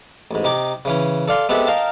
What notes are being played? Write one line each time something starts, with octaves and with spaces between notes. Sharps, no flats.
A1 G#2
C3 D#4 D6
C#3 E3 C#4
A4 D5 F5 C6
G#3 B3 C4 G4 A4 E5
D#4 A#4 F5 G5 A5